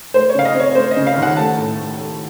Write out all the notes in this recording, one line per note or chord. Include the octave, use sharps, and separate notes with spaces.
A3 C5
C#5
C#3 F5
D#5
C4
C#5
A3 C5
D#5
C#3
F5
D#2
F#5
A3 A5
A2
A3
A3